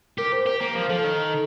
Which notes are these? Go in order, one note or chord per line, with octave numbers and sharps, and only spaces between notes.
G4 A#4
C5
G4 A#4
A#3 A#4
F3 C5
F3 A4
D#3